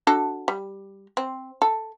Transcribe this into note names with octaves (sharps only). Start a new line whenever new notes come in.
D4 F#4 A4
G3
C4
A4